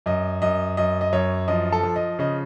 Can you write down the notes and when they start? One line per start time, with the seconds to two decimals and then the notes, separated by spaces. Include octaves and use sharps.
0.06 F#2 D#5
0.42 F#2 D#5
0.77 F#2 D#5
1.01 D#5
1.12 F#2 C#5
1.48 F3 D#5
1.72 A4
1.83 F3
1.96 D#5
2.19 C#3 D#5